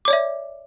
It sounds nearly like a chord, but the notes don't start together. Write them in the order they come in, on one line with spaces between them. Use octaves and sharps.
D6 C#5 D5 E5